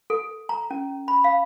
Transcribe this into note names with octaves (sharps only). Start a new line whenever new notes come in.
A4
A#5
C#4
B5
F5